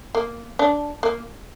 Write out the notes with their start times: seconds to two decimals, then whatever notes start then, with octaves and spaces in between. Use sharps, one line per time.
0.15 A#3
0.59 D4
1.03 A#3